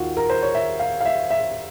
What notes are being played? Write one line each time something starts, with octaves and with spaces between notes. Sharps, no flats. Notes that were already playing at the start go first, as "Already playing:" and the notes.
Already playing: D#2 D#3 F4 F#4
A#4
C5
C#5
E5
F5
F5
E5
E5